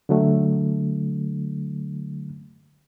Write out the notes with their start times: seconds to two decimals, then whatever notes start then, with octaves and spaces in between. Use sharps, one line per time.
0.09 D3 F#3 A3